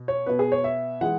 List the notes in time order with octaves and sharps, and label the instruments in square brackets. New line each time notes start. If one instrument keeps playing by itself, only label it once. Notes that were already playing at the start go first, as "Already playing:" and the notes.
Already playing: [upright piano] B2
C#5
B2 B3 B4
G#4
C#5
E5
E3 G#3 F#5